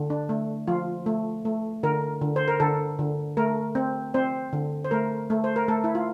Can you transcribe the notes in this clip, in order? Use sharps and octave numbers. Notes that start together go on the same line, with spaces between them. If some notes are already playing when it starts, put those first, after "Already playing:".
Already playing: D3
D4
A3
F3 F4
A3
A3
D3 A#4
D3
C5
A#4
D3 A4
D3
A3 A#4
C4
C4 C5
D3
C5
A3 A#4
A3
C5
A#4
A3 A4
E4
F4